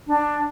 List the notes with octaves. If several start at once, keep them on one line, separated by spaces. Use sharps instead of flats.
D4